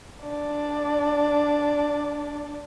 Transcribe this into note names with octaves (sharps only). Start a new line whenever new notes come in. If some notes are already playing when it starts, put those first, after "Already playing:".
D4 D5